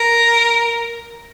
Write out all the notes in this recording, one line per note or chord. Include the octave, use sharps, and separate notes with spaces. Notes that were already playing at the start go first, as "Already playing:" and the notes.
Already playing: A#4